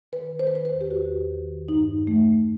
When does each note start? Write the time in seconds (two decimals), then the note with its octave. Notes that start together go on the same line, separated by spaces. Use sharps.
0.12 D#3 B4
0.32 D#3
0.39 C5
0.47 B4
0.52 D#3 C5
0.65 B4
0.71 E2
0.81 G4
0.91 E2 F#4
1.10 E2
1.30 D#3
1.49 D#3
1.69 G2 D#4
1.88 G2
2.07 E3 A3
2.27 G2